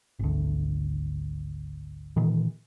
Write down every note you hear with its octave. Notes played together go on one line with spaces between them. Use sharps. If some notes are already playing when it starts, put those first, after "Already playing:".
G#1 D2
A#2 D#3 E3